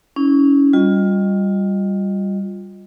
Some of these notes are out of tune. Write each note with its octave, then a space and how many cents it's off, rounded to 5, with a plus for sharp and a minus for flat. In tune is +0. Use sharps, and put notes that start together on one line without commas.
C#4 +15 E4 -35
G3 +0 F4 +20 D#5 +0